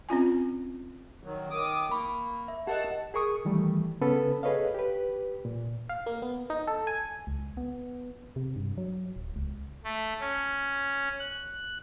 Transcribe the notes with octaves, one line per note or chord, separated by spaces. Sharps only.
C4 C#4 F4 G#5
D#3 F#3
D#3 D6 D#6
A#3 B5 C#6
E5
G4 A#4 D#5 F#5 A5
G#4 A#4 C#6 D#6
D#3 E3 G3 A3
C#3 B3 C#4 A4 B4
G#4 A4 B4 C#5 D#5 F5
G4 B4
A#2
F5
A#3
B3
D#4
A4
G#5
C#2
B3
C3
G2
F#3
D1
C#2
A3
C#4
F#6